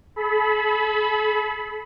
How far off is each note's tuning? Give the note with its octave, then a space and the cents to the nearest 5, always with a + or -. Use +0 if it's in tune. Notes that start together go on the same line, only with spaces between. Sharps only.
A4 -45 B5 +0